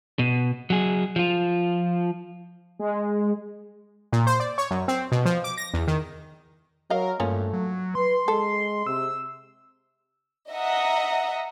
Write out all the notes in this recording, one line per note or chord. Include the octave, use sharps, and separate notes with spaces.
B2
F#3 G#4
F3 F4
G#3
A#2
C5
D5
C#5
F#2
C4
B2
F3
D6
A#6
E2
D#3
F#3 A#4 D#5 F5
G2 F3 A3 A#3 C#4
F#3
B4 C6
G#3 A4
C3 E6
D#5 E5 F#5 A#5 D#6